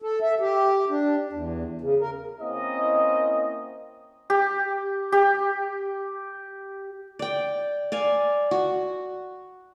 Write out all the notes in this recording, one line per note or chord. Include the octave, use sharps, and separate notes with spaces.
A4
E5
G4
D4
E2
C#3
A#4
A#3 C4 C#4 E4 D#5
G4
G4
D5 G5
D5 F5 G#5
F#4